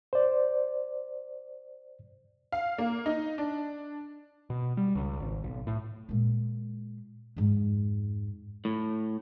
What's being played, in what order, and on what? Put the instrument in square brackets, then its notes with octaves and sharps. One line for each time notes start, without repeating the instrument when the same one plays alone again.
[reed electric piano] C5 D5
[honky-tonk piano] F5
A#3
D#4
D4
[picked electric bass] B2
G3
C#2
G#1
B1
A2
[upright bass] A#2 G#3
F2 G#2
[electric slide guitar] A2